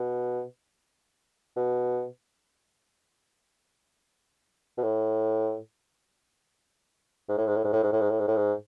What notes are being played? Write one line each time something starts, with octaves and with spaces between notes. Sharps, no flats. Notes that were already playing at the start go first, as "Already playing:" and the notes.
Already playing: B2
B2
B2
A2
G#2
A2
G#2
A2
G#2
A2
G#2
A2
G#2
A2
G#2
A2
G#2